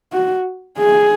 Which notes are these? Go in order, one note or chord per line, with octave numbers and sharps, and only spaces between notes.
F#4
G#4